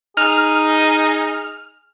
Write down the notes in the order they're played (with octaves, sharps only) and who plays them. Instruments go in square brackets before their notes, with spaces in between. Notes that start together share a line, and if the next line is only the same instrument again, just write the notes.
[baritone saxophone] D#4 [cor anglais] G#4 [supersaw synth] F6